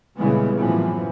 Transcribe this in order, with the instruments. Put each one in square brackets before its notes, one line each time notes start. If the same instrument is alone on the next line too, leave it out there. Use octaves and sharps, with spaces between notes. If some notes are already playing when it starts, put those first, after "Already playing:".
[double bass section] A#2 C#3 E3 G3 G#3 B3
F#2 A2 C3 E3 F3 B3